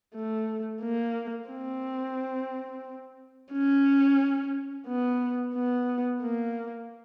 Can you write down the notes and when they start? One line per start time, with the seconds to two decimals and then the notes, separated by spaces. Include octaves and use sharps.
0.15 A3
0.83 A#3
1.50 C4
3.53 C#4
4.87 B3
5.55 B3
6.23 A#3